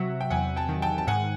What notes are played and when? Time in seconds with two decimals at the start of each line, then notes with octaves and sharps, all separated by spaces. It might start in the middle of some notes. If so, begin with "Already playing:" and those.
Already playing: C3 F#3 E5 F#5
0.21 G5
0.30 E2 F#5 G#5
0.56 G5 A5
0.69 D#3
0.82 G5 A5
0.98 A5
1.07 G#2 F#5 G#5